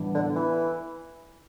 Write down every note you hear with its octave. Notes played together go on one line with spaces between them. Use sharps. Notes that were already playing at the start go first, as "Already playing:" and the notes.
Already playing: A2 E3 G3 B3 D4
D3
E3